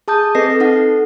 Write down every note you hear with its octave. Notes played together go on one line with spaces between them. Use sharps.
G#4 A5 D#6 G6
C4 A4 B4 D#5 A#6 C7
D#4 A4 F#5